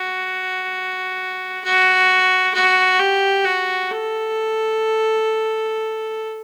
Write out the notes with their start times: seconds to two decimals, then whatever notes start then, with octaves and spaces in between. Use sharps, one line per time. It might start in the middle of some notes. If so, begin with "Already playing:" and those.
Already playing: F#4
1.64 F#4
2.54 F#4
2.99 G4
3.45 F#4
3.91 A4